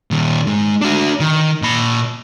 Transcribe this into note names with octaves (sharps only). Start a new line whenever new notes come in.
A#2 D#3
G#2 G#3
D4 F#4
D#3
A#2 B5